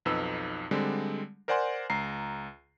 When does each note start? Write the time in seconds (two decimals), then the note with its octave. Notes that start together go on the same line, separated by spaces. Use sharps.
0.05 B1 F2 D#4 B4 E6
0.71 D3 G3 G#3 C4
1.48 A#4 C5 D5 F#5 G#5 C6
1.90 C#2 A#5 C7